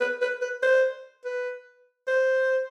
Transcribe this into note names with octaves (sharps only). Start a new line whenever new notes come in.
B4
B4
B4
C5
B4
C5